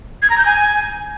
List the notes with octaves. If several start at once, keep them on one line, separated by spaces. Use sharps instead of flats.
G#6
A#5
G6
G#5